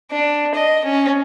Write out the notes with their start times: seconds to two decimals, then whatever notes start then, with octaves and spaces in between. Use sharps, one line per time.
0.11 D4
0.54 D#5
0.85 C#4